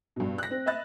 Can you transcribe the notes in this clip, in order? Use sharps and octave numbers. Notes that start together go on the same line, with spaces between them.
G2 B2
F#6 A#6
C4
D#5 E5 B5 F#6 A6